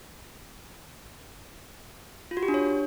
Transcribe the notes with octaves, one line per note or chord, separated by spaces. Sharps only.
F4
F#4
G4
D4
C#5